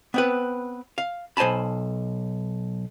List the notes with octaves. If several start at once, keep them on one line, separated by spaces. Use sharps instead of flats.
B3 C4 B4
F5
B1 C5 G#5 A5 B5